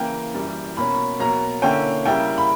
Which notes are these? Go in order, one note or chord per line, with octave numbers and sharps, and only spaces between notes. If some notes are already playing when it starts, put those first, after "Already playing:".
Already playing: C#3 E3 A#3 G5
F#2 E3 G3
B2 A#3 C#4 B5
B2 F#3 A#3 A#5
D3 A#3 C#4 E4 G5
C#3 G3 A#3 E4 G5
B5